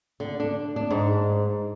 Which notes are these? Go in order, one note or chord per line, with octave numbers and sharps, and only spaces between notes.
D3
D4
D4
G#2